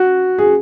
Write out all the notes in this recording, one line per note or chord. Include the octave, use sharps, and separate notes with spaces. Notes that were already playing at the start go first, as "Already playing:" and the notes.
Already playing: F#4
G#4